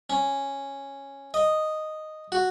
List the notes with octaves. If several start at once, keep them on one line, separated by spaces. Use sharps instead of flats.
C#4
D#5
F#4